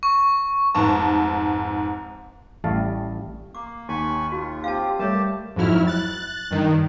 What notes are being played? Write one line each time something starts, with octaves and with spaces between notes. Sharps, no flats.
C#6
F1 G#2 A5
A1 G3 A3 F5 A5
A#3 D6
D#2 G#5 B5 C#6
F4 F#4
C4 F4 G4 F5 A5
G3 A3 G4 A#4 C#5 E5 A5
F2 G#2 F#3 E4 F6
F#6 A6
G2 D#3